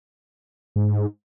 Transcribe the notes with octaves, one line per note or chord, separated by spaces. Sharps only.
G#2